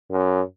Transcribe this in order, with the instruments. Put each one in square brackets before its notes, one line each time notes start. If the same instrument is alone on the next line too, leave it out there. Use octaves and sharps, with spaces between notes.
[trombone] F#2